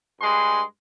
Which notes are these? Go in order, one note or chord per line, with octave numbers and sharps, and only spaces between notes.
G2 G#3 G#5 C6